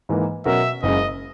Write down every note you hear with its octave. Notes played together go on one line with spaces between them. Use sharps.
G#2 E3 A#3
B2 F#3 C#4 F#4 A#4 E5
F#1 F#2 C#3 G#3 D#5